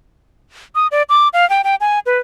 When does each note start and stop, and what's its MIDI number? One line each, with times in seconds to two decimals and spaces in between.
0.75 0.87 87
0.91 1.03 74
1.09 1.28 86
1.33 1.48 77
1.50 1.62 79
1.64 1.75 79
1.81 1.99 80
2.06 2.19 71